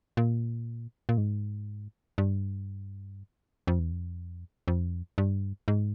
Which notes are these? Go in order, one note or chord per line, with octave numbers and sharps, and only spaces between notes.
A#2
A#2
G#2
G2
F2
E2
F2
F2
G2
G#2